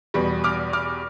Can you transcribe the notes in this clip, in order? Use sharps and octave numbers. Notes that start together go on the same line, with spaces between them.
E2 B2 G3 B3
D6 F6
D6 F6